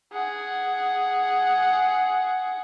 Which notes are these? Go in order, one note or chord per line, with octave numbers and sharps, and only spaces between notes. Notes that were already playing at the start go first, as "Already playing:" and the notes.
G#4 F#5